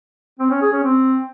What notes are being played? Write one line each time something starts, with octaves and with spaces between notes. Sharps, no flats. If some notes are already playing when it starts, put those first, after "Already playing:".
C4
C#4
G#4
C#4
C4